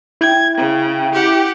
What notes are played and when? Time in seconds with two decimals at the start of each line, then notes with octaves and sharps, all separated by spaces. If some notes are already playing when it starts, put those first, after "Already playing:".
0.21 E4 G5 G#6
0.58 C#3
1.13 G4 F#5